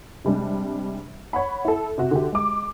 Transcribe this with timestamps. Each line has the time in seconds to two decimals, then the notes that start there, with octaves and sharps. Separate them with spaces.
0.25 C3 G3 G#3 D4
1.33 C#5 F#5 B5
1.65 E4 A4
1.98 C3 F#4
2.11 D3 F#4 G4
2.32 G#3 D6